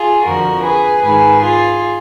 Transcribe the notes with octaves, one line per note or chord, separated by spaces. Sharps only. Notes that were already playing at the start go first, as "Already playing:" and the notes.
Already playing: F4 G#4
F2 D3 F3 F#4 A#4
G#4 B4
G#2 D#3 G#4 B4
F4 G#4